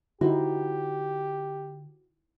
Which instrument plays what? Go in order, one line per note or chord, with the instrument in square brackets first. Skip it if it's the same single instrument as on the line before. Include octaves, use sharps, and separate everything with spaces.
[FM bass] D3 [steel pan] D#4 E4 [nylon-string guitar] F#4 C5 [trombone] G4